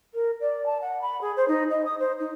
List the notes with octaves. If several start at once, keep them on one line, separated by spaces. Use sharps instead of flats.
A#4
D5
A5
F#5
B5
G#4
C5
D#4
D#5
D#6
C5
D#4